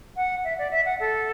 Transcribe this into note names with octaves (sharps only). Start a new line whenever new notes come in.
F#5
E5
D5
E5
F#5
A4